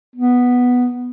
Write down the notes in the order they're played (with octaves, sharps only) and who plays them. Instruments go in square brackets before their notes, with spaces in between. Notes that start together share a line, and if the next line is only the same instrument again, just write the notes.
[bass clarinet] B3